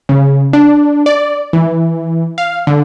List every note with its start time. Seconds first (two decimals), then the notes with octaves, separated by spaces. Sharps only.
0.09 C#3
0.53 D4
1.06 D5
1.53 E3
2.38 F5
2.67 D3